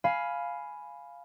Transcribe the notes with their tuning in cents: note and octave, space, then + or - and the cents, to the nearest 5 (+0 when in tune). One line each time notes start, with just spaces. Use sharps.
F5 +0 G#5 +10 B5 +0